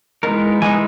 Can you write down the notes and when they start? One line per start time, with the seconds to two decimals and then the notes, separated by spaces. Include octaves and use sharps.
0.23 E3 G#3 B3 D#4 A#4
0.62 E3 G#3 B3 D#4 G#5